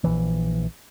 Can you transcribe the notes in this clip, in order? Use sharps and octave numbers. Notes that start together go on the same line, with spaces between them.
A#1 E3